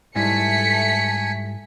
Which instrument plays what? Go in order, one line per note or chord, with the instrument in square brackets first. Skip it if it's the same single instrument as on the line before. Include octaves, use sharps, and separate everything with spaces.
[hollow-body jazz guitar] G#2 G3 E4 [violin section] A3 B6 C#7 [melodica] G#5